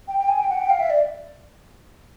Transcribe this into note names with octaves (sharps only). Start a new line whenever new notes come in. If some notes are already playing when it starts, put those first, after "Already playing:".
G5
G5
G#5
G5
F#5
G5
F5
E5
D5